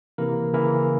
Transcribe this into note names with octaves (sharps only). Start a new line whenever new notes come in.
C3 E3 A#3 E4 A#4
C#3 E3 A#3 E4 A#4